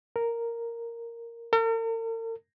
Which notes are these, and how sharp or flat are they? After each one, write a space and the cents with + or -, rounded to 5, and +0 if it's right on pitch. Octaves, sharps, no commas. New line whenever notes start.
A#4 -5
A#4 -45